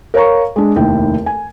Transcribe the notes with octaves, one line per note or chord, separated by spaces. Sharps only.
A#4 C#5 F5 A#5 C#6
G#3 D4
F1 D#2 E4 G5
G#5